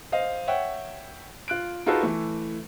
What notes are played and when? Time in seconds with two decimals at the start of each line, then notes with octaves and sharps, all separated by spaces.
0.12 C5 D#5 F5
0.47 C#5 E5 F#5 G5
1.48 F4 F#6 D7
1.86 D#4 F4 F#4 G#4 A4 B4
2.03 E3 A3